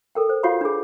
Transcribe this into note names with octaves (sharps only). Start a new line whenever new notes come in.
A4 A#4 G5
C5
F4 F#4 C#5 F5 F#5 B5
D4 G#4